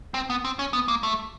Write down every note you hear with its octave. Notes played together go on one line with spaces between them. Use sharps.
C4
B3
C4
C#4
B3
A#3
A3